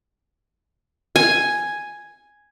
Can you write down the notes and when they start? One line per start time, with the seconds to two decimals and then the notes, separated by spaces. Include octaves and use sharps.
1.16 G#5